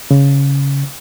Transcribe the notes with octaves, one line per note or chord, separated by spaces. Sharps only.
C#3